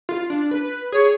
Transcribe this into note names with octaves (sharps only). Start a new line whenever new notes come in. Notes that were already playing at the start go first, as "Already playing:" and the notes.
F4
D4
B4
G#4 C#5